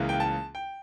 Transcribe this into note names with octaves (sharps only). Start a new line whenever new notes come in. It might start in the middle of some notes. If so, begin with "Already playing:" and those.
Already playing: C#2 C#3 E3 A#3
G5
A5
G5